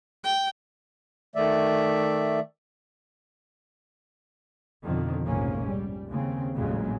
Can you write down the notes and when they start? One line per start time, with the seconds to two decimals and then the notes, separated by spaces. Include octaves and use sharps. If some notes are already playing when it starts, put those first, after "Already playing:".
0.24 G5
1.36 D#3 A3 D5 E5
4.84 F2 B2 D3 D#3 F3
5.24 F1 A#1 G#2 C3 A#3 C#4
5.67 G3
6.07 D#2 C#3 C4
6.54 A1 F2 A#2 C#3 F#3 G#3